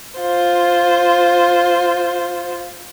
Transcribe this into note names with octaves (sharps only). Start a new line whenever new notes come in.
F4 C5